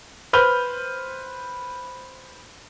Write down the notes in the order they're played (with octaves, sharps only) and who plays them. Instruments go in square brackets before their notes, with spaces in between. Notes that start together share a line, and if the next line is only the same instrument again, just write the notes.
[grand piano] B4 C5 F6 G7